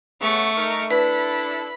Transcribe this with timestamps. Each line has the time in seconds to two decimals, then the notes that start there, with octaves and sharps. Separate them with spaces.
0.21 C#3 A3 B3 F#5 C#6
0.57 D#4 A#4
0.91 D4 E4 A4 B4 B5